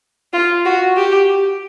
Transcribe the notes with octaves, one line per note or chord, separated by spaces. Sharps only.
F4
F#4
G4